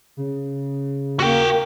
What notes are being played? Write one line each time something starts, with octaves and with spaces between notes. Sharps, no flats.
C#3
A#3 F#4 G5